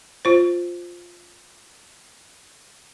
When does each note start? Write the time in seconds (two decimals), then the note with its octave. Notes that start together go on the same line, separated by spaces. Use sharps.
0.25 F4 C5